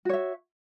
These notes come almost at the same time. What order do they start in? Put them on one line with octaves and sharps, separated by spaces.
F#4 C#5 E5